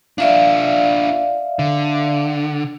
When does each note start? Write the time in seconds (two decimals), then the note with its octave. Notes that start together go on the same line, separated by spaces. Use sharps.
0.18 D4 F4 D5 E5 F5
1.59 D3